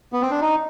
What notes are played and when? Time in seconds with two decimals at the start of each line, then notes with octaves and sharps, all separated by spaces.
0.13 B3
0.22 C4
0.31 D4
0.41 D#4